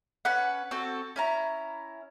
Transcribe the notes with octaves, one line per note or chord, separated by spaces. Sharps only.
C#4 B4 F#5
C4 F#4 A4
C#4 E4 A#5